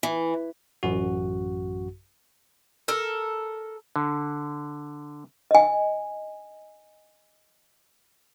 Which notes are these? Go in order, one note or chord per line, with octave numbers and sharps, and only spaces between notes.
E3
A1 F#2 F#4
A4 A#4
D3
D#5 G#5